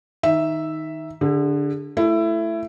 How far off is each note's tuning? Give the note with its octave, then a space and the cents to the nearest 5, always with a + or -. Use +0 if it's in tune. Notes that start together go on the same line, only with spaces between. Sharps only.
D#3 +10 E5 +0
D3 +0 G#4 -45
A3 +0 E4 +20